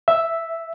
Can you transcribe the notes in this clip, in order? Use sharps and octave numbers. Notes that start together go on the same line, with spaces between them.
E5